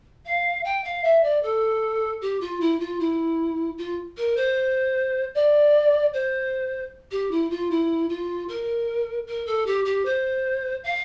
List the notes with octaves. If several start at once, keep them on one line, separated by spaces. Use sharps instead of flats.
F5
G5
F5
E5
D5
A4
G4
F4
E4
F4
E4
F4
A#4
C5
D5
C5
G4
E4
F4
E4
F4
A#4
A#4
A4
G4
G4
C5
F5